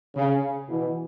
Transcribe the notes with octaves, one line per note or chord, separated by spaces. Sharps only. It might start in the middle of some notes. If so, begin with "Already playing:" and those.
C#3
B2 E3